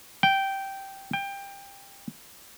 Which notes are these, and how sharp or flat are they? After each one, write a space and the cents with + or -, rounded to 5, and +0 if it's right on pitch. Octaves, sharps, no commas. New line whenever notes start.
G5 -10
G5 +20